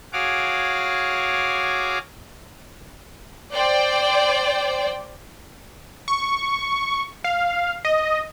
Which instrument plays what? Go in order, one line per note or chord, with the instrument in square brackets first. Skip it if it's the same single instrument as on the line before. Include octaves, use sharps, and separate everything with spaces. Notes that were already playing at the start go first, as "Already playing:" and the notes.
[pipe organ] F#4 G#4 C#5 F5 D6
[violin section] C5 D5 G5
[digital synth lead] C#6
F5
D#5